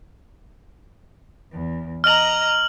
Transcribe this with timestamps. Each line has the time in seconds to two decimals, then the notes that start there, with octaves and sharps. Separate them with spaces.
1.51 E2
2.04 D#5 A#5 F6 F#7